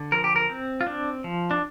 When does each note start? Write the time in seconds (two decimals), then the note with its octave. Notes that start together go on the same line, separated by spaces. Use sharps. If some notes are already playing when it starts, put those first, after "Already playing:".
Already playing: D3
0.12 F3 A#4
0.24 G4
0.36 A#4
0.49 C4
0.81 F4
0.87 C4 D4
1.24 F3
1.51 D4